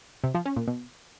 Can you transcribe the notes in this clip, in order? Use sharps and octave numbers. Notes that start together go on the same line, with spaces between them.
C3
F3
C#4
A#2
B2